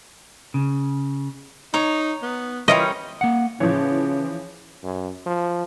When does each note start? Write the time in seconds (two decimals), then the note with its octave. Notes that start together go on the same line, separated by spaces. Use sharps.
0.54 C#3
1.74 D#4 C#5 A#5
2.23 B3
2.68 E3 G3 C#4 E4 F4 A#4 D#5
3.21 A#3 F#5
3.60 C#3 E3 F3 C#5
4.83 F#2
5.26 F3